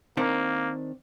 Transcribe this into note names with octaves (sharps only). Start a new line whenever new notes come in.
D#3 A#3 C4 D4